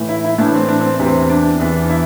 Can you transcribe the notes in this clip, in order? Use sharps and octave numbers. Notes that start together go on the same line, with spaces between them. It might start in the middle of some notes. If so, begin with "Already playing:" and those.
Already playing: A2 E3
E4
E4
A2 E3 D4
C4
D4
C4
E2 C3 E3
C4
D4
E2 E3
E4